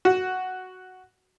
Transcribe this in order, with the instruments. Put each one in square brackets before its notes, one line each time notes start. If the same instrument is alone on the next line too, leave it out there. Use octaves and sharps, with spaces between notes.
[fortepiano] F#4